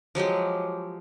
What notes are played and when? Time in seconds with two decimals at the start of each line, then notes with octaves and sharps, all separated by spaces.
0.15 F3 F#3 G#3 G4